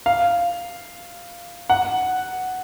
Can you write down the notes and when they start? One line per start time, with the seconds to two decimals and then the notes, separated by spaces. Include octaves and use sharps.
0.06 F5
1.70 F#5